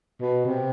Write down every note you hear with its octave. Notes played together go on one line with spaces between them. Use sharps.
B2
C3